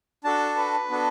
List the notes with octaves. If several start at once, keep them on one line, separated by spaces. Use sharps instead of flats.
D4 F#4 A4 A5
B4
B3 D4 F#4 A4